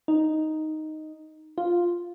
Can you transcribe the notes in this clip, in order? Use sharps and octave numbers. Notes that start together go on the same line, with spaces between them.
D#4
F4